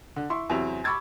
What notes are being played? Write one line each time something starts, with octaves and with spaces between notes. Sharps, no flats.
D3
E4 C6 C#6
E2 C3 F#3 C4 E4 F7
B5 C#6 D6 E6 G#6 A6